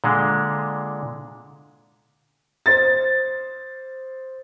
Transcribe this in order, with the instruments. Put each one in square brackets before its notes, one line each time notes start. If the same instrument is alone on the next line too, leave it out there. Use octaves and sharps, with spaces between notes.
[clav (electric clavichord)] A#2 D3 G#3
[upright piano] C5 A6